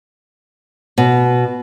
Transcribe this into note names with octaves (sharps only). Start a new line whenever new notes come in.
B2